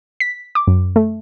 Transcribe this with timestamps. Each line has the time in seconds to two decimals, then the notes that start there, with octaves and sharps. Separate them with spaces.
0.20 B6
0.55 D6
0.67 F#2
0.96 A3